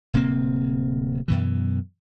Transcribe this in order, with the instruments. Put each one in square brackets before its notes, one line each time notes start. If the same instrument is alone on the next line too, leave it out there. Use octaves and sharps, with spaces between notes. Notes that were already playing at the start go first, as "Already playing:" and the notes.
[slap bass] D1 C3 A#3 C4
F#2 B2 E3